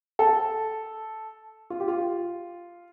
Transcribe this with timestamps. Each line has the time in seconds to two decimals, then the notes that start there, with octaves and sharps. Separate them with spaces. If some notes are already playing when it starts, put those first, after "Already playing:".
0.19 A4
1.70 F4
1.80 G4
1.88 F4